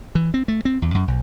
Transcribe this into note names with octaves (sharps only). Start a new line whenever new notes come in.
E3
C4
A3
C4
E2
F#2
B1